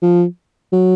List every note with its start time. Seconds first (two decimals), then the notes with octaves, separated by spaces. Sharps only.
0.02 F3
0.73 F#3